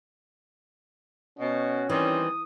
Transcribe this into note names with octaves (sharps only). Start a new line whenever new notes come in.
B2 C#4 F#4
D#3 E3 G3 C4 D#6